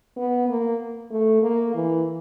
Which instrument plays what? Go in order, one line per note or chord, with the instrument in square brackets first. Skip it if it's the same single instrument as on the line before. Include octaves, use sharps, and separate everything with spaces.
[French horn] B3
A#3
A3
A#3
E3